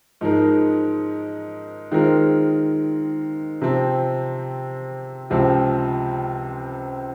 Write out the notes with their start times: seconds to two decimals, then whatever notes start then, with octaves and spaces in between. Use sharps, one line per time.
0.21 G#2 F3 G#3 D#4 A#4
1.91 D#3 G#3 C4 F4 A#4
3.62 C3 F3 C4
5.30 C#2 C3 F3 C4 F4